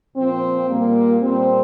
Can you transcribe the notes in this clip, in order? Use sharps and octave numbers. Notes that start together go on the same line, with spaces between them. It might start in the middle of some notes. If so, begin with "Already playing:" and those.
A#2 F3 C4
A#2 G3 A#3
A#2 G3 C4